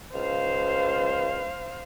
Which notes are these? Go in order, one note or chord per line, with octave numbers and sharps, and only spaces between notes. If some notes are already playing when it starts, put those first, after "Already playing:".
C#2 C5 F5